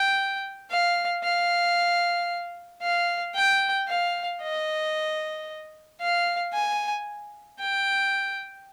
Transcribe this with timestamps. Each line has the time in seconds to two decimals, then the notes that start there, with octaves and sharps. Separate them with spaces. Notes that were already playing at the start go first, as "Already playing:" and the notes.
Already playing: G5
0.70 F5
1.23 F5
2.82 F5
3.35 G5
3.88 F5
4.42 D#5
6.01 F5
6.53 G#5
7.60 G5